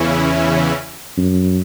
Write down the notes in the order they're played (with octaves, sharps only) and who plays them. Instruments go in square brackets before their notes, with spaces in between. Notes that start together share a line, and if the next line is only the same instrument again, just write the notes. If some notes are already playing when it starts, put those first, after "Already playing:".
Already playing: [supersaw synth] E2 C#3 E3 C#4 E4
[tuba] F#2